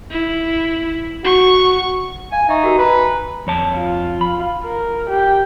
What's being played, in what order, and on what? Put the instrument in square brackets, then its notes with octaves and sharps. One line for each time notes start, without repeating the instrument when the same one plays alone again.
[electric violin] E4
[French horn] F#4 [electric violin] C#6
[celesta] F5 [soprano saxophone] G#5
[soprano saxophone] D#4 [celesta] E5 C#6
[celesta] F#4 G4 A#4
[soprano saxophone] B4 [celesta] G#5 A#5
[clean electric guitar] F2 C#5 A5
[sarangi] F4
[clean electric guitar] B5
[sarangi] A#4
G4